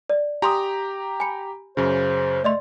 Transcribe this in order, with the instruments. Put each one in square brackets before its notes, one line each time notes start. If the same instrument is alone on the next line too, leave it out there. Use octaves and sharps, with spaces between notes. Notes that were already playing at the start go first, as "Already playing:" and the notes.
[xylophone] D5
[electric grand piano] G4 A#5 [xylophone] G#5 C6 D#6
[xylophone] G#5 B5 C#7
[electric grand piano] F#2 C#3 [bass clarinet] C5
[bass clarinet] A3 [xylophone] D5 D#5 C6